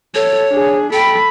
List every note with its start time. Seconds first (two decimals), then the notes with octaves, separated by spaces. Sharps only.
0.15 A4 C#5
0.50 D4 G#4
0.93 A4 G5 B5